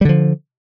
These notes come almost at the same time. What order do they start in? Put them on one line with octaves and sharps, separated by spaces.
G3 D3 F3